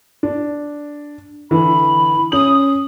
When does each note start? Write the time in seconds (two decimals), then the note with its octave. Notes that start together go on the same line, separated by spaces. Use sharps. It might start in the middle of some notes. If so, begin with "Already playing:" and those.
0.23 D4
1.51 D3 E3 B5
2.32 C#4 D#6 F#7